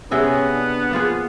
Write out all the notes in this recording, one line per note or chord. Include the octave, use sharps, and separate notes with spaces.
C3 B3 C#4 G#4 E5
D4
F3 A#3 F4 G#4